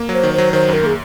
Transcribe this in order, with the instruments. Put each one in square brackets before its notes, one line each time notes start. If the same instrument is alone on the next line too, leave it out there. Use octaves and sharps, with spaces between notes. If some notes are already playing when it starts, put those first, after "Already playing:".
Already playing: [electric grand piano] A#3
[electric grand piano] F#3 [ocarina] C5
[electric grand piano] D#3
[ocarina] C5
[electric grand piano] F#3
[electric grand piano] D#3 [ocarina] C5
[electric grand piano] F#2 [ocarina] A#4
[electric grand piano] A#3 [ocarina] G#4